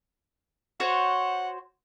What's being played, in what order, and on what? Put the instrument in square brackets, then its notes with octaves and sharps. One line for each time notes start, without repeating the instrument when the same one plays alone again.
[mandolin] F#4 C5 C#5 [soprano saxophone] F#5